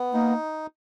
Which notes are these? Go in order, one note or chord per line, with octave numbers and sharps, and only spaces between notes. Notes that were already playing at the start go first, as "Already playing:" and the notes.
Already playing: B3
A#3 D#4